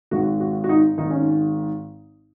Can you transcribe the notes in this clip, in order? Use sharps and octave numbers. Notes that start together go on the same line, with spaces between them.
G#1 G#2 D#3 F#4
F#4
F#4
D#4
G#1 G#2 D#3 D#4
C#4